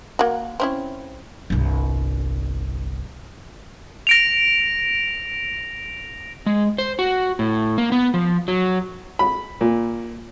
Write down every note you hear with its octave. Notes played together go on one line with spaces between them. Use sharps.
A#3 F#4
C4 C#4 E4
G1 C2
A#6 D7 F7
G#3
C5
F#4
A2
A#3
B3
F3
F#3
B5
A#2